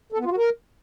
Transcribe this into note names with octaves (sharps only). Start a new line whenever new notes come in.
A4
B3
F4
F#4
A#4